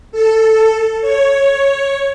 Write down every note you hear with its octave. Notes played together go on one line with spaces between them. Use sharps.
A4
C#5